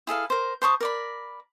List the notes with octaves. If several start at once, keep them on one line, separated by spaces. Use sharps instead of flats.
E4 G#4 A4 F5
A#4 C5
C5 A5 C#6 D#6
A#4 D5 B5